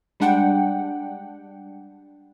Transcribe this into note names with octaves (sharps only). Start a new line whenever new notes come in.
G3 G#3 D4 F#5 G5